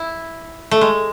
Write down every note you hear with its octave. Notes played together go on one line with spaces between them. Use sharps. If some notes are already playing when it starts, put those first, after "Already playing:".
Already playing: E4
A3
G#3